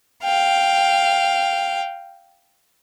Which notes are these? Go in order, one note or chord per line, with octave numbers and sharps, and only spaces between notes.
F5 G5